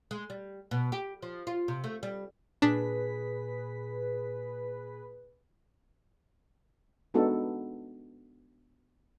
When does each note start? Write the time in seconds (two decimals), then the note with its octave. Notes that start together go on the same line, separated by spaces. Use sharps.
0.11 G#3
0.30 G3
0.71 B2
0.92 G4
1.22 F3
1.47 F4
1.68 C3
1.84 A3
2.03 G3
2.62 A#2 D4 G#4 B4 B6
7.14 G#3 B3 D4 D#4 F#4 A4